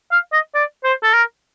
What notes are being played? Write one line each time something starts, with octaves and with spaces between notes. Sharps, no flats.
F5
D#5
D5
C5
A4
A#4